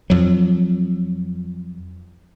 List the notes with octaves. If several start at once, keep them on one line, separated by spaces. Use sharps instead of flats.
F2 F#3